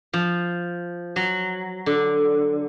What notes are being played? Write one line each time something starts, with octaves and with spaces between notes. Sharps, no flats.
F3
F#3
D3